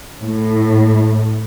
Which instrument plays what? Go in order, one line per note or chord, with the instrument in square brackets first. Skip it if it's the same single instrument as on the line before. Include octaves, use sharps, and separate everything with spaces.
[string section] A2